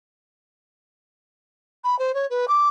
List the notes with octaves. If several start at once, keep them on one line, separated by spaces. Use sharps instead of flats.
B5
C5
C#5
B4
D6